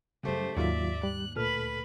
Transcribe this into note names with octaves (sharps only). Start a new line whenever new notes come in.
F#2 C#3 G3 A3 G4 C5
D#2 G#2 D#3 F#3 F4 D5 E5
G3 F#6
D2 A#2 A4 B4 B5 F6